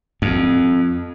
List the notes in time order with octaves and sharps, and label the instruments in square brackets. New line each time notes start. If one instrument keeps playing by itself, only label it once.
[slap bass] F2